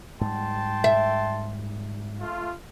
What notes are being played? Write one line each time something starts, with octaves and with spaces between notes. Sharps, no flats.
G#2 G3 G5 A5 C6
E5
A3 F4